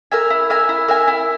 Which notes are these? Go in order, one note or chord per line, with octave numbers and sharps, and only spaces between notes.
A#4 E5 G#5
E4
A#4 E5 G#5
E4
A#4 E5 G#5
E4